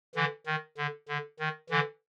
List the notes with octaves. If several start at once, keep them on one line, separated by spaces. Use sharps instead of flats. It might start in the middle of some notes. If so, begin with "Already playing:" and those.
D3 E3
D#3
D3
D3
D#3
D3 E3